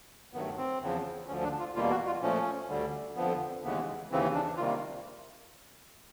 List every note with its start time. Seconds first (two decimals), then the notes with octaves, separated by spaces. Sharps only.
0.33 G2 D#3 F#3 A3 B3
0.58 C4
0.81 E2 C#3 F3
1.28 D2 D3 F3 C#4
1.44 D4
1.60 F4
1.75 E2 B2 G3 A#3 F4
1.91 F#4
2.07 F4
2.22 A#2 F3 A3 C#4
2.69 D2 D3 G3
3.16 F2 D3 F3 B3
3.63 D#2 C#3 E3 G#3 B3
4.11 D#2 C#3 E3 C4
4.34 D4
4.57 C3 D#3 G3 A#3 F4